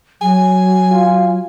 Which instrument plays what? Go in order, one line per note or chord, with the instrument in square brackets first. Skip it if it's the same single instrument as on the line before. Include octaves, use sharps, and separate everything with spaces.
[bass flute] F#3 [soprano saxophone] G#5
[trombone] F4